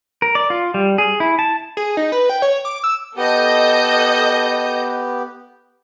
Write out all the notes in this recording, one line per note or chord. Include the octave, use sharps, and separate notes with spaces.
A#4
D5
F4
G3
G#4
E4
A5
G#4
D#4
B4
G5
C#5
D6
E6
B3 G4 A4 D#5 G6